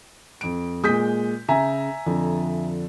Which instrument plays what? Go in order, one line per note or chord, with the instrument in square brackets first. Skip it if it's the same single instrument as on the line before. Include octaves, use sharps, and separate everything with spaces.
[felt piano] F2 D7
[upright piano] A#2 G#3 [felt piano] D#6 G6 B6
[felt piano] C#3 [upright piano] E5 G#5 A#5
[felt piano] F2 D3 F3